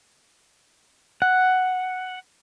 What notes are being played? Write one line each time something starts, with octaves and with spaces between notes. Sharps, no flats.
F#5